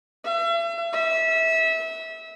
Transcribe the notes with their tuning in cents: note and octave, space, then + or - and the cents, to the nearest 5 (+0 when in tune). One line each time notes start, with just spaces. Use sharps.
E5 +40
E5 -25